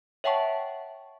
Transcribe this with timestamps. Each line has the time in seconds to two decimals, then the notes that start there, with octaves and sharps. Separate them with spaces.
0.24 C#5 E5 F#5 G5 A5 C#6